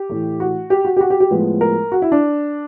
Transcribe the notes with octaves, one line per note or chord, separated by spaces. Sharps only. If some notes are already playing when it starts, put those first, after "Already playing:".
Already playing: G4
A2 E3 A3
F#4
G4
F#4
G4
F#4
G4
G4
A2 F3 G#3 B3
A#4
F#4
E4
D4